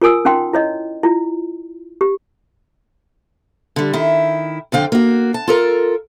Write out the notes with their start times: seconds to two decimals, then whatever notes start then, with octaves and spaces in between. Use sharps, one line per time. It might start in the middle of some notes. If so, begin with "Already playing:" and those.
0.02 F4 A#4 G#5 D#6 E6
0.25 C#4 D#4 F#5 G5 C6
0.53 E4 C#5 D#5
1.03 E4 F4
2.01 G4
3.76 D3 G3
3.93 D#3 E4
4.72 F2 D3 F5 G5
4.92 A#3 F#4
5.34 A5
5.48 F4 A4 A#4